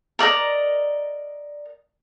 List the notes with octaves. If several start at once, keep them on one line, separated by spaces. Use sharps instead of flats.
A#4 D5 D#5 A#5